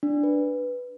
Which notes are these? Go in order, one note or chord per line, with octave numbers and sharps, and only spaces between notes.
D4
B4